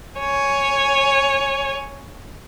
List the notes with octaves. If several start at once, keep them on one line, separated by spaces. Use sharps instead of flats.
C#5 G#5